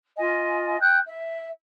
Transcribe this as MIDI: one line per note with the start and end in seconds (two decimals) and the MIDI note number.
0.17 0.79 65
0.17 0.79 75
0.17 0.79 80
0.81 0.97 79
0.81 0.97 90
0.81 0.97 91
1.05 1.49 76